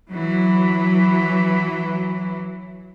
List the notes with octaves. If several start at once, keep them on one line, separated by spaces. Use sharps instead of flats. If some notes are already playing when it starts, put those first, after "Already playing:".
E3 F#3